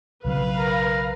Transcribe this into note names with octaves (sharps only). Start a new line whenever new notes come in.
B1 C#3 F#3 B4 F5
A#4